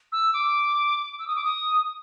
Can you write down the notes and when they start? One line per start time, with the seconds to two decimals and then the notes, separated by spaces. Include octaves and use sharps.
0.12 E6
0.34 D6
1.19 E6
1.27 D#6
1.36 D6
1.44 D#6